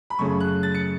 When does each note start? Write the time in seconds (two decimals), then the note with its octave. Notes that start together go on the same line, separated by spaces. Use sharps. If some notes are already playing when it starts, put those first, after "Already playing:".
0.10 B5
0.19 F#2 C#3 A3 C#4 C#6
0.40 F#6
0.63 A6
0.75 C#7